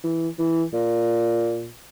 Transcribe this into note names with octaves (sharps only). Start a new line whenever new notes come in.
E3
E3
A#2